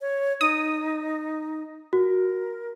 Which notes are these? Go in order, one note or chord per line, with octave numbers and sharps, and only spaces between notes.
C#5
D#4 D#6
F#4 A#4